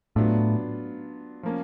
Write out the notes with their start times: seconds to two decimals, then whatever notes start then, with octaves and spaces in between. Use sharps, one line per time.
0.16 A2 F#3 B3 D4 F4
1.43 F3 A#3 C#4